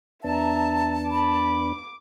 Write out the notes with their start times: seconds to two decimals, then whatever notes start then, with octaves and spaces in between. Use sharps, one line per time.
0.24 E2 B3 D4 E5 A5 A#5
1.11 B5 D6